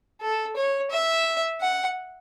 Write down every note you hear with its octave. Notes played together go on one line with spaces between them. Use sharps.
A4
C#5
E5
F#5